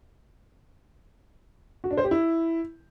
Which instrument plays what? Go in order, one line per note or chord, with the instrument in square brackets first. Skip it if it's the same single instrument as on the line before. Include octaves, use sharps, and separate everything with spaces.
[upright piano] F#4
D4
C5
G4
E4